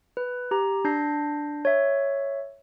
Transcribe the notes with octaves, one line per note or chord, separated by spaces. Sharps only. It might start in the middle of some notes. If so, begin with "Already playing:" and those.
B4
G4 A#5
D4 G6 A#6 C7
C#5 E5